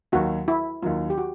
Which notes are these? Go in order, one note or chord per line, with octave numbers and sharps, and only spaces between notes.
D#2 D#3 F#3 F#4
E4
D#2 D#3 F#3 F4
G4
F#4